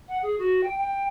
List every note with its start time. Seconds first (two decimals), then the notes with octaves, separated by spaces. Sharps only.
0.08 F#5
0.22 G#4
0.38 F#4
0.63 G5
0.78 G5